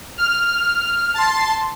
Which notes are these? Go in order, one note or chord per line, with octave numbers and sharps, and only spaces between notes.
F6
A5 C6